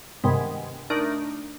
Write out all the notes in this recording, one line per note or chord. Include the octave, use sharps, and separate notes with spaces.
G2 C3 D#3 G#3 B3
A3 D4 D#4 A#4 D5